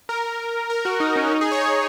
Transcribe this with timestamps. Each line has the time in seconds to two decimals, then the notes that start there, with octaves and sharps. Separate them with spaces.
0.09 A#4
0.70 A#4
0.85 F#4
0.95 F#4
1.00 D#4
1.16 C#4
1.27 C#4
1.31 D#4
1.41 G#4
1.52 C#5
1.62 G#4